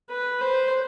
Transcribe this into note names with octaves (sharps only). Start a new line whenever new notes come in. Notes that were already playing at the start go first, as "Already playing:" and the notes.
B4
C5